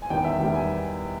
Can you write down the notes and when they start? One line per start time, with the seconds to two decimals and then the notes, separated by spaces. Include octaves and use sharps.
0.02 G#5
0.10 E2 D#3 G3 B3 G5
0.25 E5
0.40 E2 D#3 G3 B3 G5
0.55 G#5